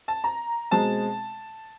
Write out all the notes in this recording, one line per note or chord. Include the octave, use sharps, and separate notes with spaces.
A5
A#5
B2 G#3 C4 A5